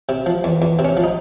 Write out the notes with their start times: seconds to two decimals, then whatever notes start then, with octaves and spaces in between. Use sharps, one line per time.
0.09 C3
0.26 F3
0.44 E2
0.62 E2
0.79 C3
0.85 C#4
0.97 F3
1.04 D#4